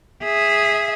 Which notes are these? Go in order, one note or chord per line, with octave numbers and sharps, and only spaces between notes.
G#4 E5